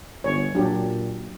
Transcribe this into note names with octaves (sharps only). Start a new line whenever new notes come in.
G1 C#5
A#2 F#3 D4 G4